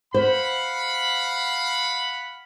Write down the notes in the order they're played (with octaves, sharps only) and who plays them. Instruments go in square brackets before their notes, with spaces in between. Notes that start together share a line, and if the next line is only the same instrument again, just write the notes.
[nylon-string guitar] C5 [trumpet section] F5 F#5 B5